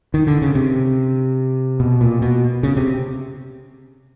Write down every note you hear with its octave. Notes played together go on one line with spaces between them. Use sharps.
D#3
D3
C#3
C3
B2
A#2
B2
C#3
C3